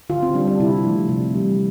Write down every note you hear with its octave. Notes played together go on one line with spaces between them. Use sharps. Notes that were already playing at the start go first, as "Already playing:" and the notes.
D3 F4
C4
G3 D4
D4
C3 E4
F3 A3
C3
E3 G3